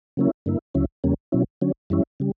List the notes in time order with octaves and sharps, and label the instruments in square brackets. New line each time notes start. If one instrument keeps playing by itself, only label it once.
[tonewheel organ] C#3 F#3 A#3 C#4 E4
G2 D3 A#3 E4
D2 C#3 F#3 C#4 E4
E2 C#3 G3 A#3 C#4
B2 F#3 C#4 E4
D3 F#3 C#4
F#2 E3 G3 C#4 E4
C#3 G3